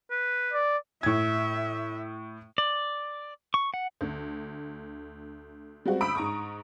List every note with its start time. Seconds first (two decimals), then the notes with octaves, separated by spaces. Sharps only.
0.10 B4
0.53 D5
1.03 A2 E5 G#6
2.58 D5
3.54 C#6
3.74 F#5
4.01 D2
5.86 G3 G#3 C4 F#4
6.01 G1 B5 D#6 E6 D7
6.15 G#2 A#5 C#6 D#6